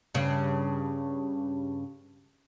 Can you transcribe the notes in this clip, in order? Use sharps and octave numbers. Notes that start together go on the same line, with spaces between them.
G2 C#3